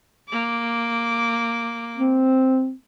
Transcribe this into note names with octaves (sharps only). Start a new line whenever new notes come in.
A#3 D6
C4